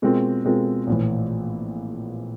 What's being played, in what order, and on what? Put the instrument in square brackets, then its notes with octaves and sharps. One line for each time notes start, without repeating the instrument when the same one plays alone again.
[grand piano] B2 G#3 C4 F4 A#4
B2 G#3 C4 F4 A#4
A#1 A2 E3